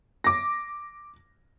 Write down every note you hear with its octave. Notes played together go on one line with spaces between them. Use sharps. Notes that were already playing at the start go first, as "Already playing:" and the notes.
D6 A#6